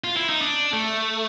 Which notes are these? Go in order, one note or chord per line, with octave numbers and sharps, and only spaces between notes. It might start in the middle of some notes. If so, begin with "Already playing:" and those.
F4
E4
D#4
D4
A3